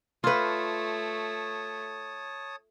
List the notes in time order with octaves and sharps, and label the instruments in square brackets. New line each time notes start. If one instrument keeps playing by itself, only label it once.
[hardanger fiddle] A3 [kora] F4 B4 [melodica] C#5 A5 D#6